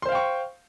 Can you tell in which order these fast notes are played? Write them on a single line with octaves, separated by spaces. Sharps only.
C6 C5 F5 G5 C#6